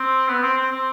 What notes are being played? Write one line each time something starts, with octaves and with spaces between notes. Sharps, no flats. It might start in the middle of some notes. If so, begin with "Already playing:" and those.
Already playing: C4
B3
C4
C4
C4